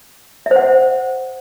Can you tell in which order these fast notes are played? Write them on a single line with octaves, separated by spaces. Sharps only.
E5 C5 F#5